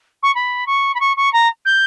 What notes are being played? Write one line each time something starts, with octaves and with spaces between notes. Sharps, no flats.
C#6
B5
C#6
B5
C#6
C#6
A#5
G6